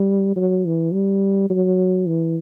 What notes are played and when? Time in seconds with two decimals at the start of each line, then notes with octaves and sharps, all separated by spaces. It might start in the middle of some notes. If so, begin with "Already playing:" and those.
Already playing: G3
0.36 F#3
0.65 E3
0.93 G3
1.50 F#3
2.07 E3